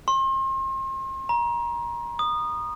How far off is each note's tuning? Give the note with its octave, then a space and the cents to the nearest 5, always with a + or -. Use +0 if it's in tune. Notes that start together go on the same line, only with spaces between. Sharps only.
C6 +35
A#5 +30
D#6 -20